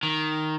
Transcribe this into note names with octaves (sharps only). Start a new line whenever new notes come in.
D#3